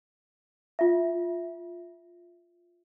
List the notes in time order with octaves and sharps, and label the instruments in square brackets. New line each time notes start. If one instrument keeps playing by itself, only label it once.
[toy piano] F4 E5